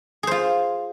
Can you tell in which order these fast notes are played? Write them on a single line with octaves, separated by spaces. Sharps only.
G#4 C5 F4